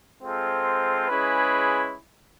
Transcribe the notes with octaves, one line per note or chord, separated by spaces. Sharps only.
G#3 C4 F4 A4 C5
G#3 C#4 E4 G#4 B4